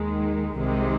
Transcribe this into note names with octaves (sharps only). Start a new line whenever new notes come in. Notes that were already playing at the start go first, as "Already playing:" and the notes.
Already playing: D#2 D#3 G#3
C2 C3 D#3 G#3